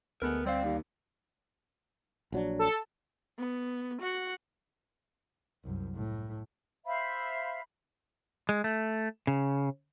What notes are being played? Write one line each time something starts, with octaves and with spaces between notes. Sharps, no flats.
D2 G#3 A3 B3 A#4
G3 C4 D5 F5
D#2
A#1 F#3 D4
A4
B3
F#4 F#5
C2 F#2
A2
C5 E5 F5 B5
G#3
A3
C#3